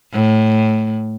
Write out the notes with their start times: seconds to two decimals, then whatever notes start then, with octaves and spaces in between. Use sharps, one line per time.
0.13 A2